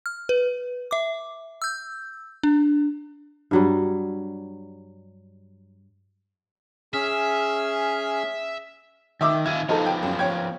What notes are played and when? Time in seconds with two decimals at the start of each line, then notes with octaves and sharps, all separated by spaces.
0.06 F6
0.29 B4
0.91 E5 D6
1.62 E6 G6
2.43 D4
3.51 G2 F#3 G3
6.94 C#4 G#4 E5 F6
9.21 D#3 E5 D6 E6
9.46 D#3 F4 E5 G#6 D#7
9.69 F3 B3 D#4 F4 A4
9.86 G5
10.03 F#2
10.19 C#5 G5 G#6